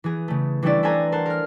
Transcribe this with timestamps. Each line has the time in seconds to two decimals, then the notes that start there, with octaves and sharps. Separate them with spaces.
0.04 E3 B3 G#4
0.28 C#3 A3
0.63 E3 G3 C#4 D4 E4 D5
0.83 A4 B4 C5 D5 G#5 A#5
1.12 A#4 C5 F#5 A5
1.26 A#4 F6